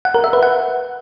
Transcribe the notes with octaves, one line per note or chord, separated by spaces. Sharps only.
F#5
A#4
E5
B4
F#5